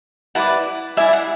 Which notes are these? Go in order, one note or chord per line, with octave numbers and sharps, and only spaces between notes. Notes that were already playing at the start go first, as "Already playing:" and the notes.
E4 B4 D5 F#5 A5
E4 B4 D5 E5 G#5
F#5